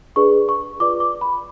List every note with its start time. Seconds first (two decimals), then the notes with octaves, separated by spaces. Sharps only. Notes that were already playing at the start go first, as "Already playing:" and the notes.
0.16 D4 G#4 B4 D5 C#6
0.49 C#6
0.80 F4 B4 D5 D6
1.00 D6
1.21 B5